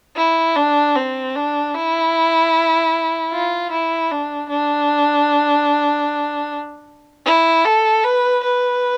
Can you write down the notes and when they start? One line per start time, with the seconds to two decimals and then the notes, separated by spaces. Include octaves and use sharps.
0.16 E4
0.56 D4
0.96 C4
1.35 D4
1.74 E4
3.32 F4
3.71 E4
4.11 D4
4.49 D4
7.26 E4
7.65 A4
8.04 B4
8.43 B4